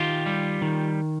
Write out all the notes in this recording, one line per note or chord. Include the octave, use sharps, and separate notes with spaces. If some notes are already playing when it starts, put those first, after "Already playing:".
Already playing: D#3 F4 G4
G3
D#3